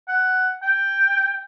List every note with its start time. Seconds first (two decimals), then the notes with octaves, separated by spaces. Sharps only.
0.08 F#5
0.62 G5